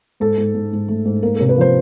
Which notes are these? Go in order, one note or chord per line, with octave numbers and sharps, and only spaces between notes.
G#2 A4
G#2
G#2
G#2
A3
G#2
A#3 A#4
C3 A#4
B4
F3 C5